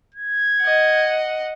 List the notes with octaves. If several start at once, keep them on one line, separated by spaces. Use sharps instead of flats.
G#6
D#5 F#5